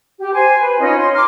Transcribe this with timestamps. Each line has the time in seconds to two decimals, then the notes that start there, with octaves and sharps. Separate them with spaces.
0.19 G4
0.33 C5 G#5
0.58 B4
0.78 C#4 D#4 F4
0.96 C6
1.13 A#5 C6 D6 F6